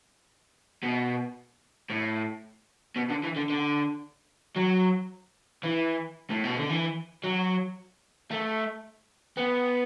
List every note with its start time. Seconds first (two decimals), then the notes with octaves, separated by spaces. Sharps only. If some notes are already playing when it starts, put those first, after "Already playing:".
0.83 B2
1.90 A2
2.96 B2
3.10 D3
3.24 E3
3.36 D3
3.50 D3
4.56 F#3
5.63 E3
6.31 A2
6.44 B2
6.57 D3
6.70 E3
7.24 F#3
8.31 A3
9.37 B3